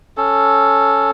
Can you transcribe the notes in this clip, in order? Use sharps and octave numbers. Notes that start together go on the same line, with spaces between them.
C#4 A4